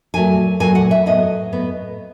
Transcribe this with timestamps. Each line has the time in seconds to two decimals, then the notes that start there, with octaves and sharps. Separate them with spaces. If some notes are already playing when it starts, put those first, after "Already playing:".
0.14 A#2 F#3 A3 G#5
0.60 A#2 F#3 A3 G#5
0.75 F#5
0.91 E5
1.06 A2 F#3 B3 D#5
1.52 A2 F#3 B3